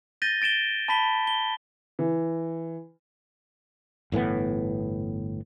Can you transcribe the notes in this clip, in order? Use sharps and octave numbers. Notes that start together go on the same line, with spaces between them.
G6 A6 A#6 D#7 G7
A6 D7 E7 G7
A5 B5 B6 G7
G7
E3
G1 A2 E3 B3